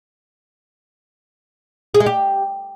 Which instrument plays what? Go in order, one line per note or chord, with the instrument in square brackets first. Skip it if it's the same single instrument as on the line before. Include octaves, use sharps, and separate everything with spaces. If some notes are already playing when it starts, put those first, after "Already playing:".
[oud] G#4
G#3
G4